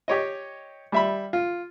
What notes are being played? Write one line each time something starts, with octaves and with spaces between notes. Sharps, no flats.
G4 C#5 D#5
G3 E5 B5
F4